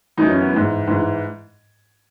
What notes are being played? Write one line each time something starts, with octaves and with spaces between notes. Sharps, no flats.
F#2 E3 D#4
C#4
B3
G#2 E3
G#2 E3